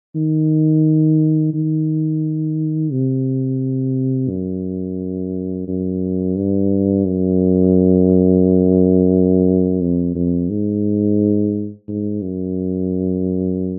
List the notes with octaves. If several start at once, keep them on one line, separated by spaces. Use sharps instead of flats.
D#3
D#3
C3
F#2
F#2
G2
F#2
F2
F2
G#2
G#2
F#2